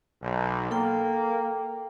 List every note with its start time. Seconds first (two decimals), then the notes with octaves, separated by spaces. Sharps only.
0.22 B1
0.71 A#3 A4 G5